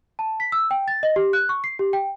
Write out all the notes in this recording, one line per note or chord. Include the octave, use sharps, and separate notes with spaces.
A5
B6
E6
G5
A6
D#5
G4
F#6
C#6
C7
G4
G5